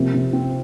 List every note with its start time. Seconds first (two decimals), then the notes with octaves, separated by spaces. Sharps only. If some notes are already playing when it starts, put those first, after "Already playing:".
Already playing: C3 F3 A#3
0.14 C3
0.33 C4